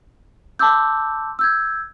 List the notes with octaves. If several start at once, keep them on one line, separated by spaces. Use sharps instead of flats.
A5 C6 D6 E6 G6
E6 G6 G#6